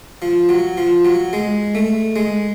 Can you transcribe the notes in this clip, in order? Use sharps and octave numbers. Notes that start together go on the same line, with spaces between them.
F3
F#3
F3
F#3
G#3
A3
G#3